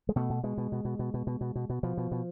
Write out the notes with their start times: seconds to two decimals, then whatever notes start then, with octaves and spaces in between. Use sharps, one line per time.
0.09 G#3
0.16 B2 A3
0.30 B2
0.43 B2 G#3
0.58 B2
0.72 B2
0.85 B2
0.99 B2
1.14 B2
1.27 B2
1.41 B2
1.55 B2
1.70 B2
1.83 B2 F3
1.97 B2
2.12 B2